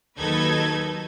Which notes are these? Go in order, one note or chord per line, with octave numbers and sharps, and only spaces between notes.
D#2 F#3 D#4 A4 B4 G#6